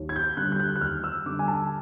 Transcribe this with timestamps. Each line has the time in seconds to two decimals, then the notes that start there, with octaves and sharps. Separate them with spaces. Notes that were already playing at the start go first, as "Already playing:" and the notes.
Already playing: D#2
0.09 G#6
0.16 G6
0.37 D3 G3 F#6
0.52 G6
0.60 F#6
0.76 F#6
0.81 D#2 F6
1.04 E6
1.26 D3 G3 D6
1.39 G#5
1.48 A5